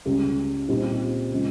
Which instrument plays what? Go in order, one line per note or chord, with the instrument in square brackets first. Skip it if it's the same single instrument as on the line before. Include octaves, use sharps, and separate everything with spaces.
[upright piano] C#2 C#3 G3
A#2 G3 C4 D#4 G4
C#3 F3 G#3